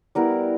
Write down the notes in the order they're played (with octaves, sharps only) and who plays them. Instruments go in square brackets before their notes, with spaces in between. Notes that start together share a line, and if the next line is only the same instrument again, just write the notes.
[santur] G3 B3 E4 A#4